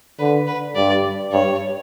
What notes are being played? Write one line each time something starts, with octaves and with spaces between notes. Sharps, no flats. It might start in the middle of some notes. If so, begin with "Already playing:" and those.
D3 B4
B4
G2 D5
G2 C#5